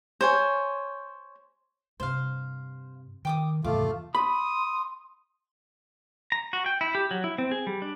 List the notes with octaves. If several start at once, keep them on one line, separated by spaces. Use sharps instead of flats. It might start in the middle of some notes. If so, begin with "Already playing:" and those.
C5 C#5 G#5
G2 C3 C5 F5
D#3 G5 D6 D#6
E2 G#2 C3 E3 A3 F4 D6
B5 C6 D#6
A#5
F#4
G5
E4
G4
F#3
E4
C4
G#4
G3
D4